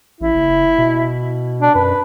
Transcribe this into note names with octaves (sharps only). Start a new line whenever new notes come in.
A1 E4
F#1
B2
D4
F#2 B4